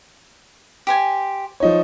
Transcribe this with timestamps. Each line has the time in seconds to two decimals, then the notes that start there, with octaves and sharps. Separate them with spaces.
0.87 G4 C5 G#5
1.60 F3 D#4 C#5